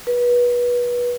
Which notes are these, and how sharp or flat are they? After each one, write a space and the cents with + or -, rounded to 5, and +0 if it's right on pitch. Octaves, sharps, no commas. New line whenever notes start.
B4 -25